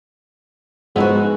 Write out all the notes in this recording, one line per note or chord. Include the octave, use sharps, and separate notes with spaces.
G#2 F3 G#3 B3 D#4 E4 F#4